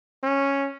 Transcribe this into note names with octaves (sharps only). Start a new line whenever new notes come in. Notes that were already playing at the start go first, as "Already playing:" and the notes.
C#4